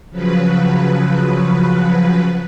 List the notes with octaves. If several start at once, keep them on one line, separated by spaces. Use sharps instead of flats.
C#3 F3 F#3 B4